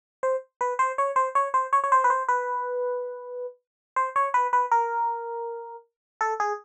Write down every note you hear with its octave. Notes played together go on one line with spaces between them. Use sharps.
C5
B4
C5
C#5
C5
C#5
C5
C#5
C#5
C5
B4
C5
B4
C5
C#5
B4
B4
A#4
A4
G#4